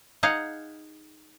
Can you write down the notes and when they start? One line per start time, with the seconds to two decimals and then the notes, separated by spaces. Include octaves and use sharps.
0.23 D#4 G#4 F5 F#5